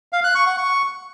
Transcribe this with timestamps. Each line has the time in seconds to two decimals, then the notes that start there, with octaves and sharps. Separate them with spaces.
0.13 F5
0.24 F#6
0.35 C#6
0.46 F#5
0.58 C#6